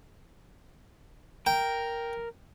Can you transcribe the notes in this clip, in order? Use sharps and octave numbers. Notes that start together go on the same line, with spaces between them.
A#4 G5